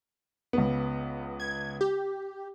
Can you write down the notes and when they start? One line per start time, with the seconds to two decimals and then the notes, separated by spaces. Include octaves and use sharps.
0.53 C#2 B3
1.40 G#6
1.81 G4